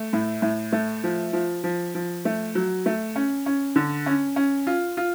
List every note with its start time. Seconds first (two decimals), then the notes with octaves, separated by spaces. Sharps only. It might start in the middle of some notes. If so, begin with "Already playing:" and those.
Already playing: A3
0.13 A2
0.42 A2
0.72 A3
1.04 F3
1.33 F3
1.64 F3
1.95 F3
2.25 A3
2.55 F#3
2.86 A3
3.16 C#4
3.46 C#4
3.76 D3
4.06 C#4
4.36 C#4
4.67 F4
4.97 F4